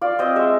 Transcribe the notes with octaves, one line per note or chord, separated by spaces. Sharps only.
F4 D5
C4 D#5
G#3 E5